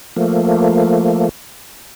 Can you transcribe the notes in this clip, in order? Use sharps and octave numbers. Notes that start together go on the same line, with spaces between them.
F3 A3 A#3